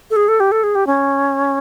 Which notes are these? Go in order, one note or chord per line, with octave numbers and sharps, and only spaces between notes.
A4
G#4
A4
G4
A4
G#4
G4
C#4